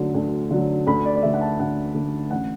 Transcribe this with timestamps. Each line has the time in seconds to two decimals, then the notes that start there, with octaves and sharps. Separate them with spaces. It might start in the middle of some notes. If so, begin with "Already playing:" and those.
Already playing: D2 D3 F#3
0.14 D2
0.50 D3 F#3
0.87 D2 B5
1.05 D5
1.15 D5
1.22 D3 A3 E5
1.34 F#5
1.41 A5
1.60 D2 F#5
1.95 D3 A3
2.31 A1 F#5